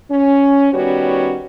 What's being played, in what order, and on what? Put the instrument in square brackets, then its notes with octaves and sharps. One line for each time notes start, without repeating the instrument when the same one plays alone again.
[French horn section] C#4
D#3 G3 B3 C#4 F#4 C#5